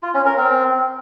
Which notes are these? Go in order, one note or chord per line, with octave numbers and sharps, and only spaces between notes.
F4
C#4
A#4
C4